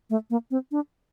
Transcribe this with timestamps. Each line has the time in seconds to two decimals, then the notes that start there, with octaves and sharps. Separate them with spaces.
0.10 A3
0.30 A#3
0.51 C4
0.72 D4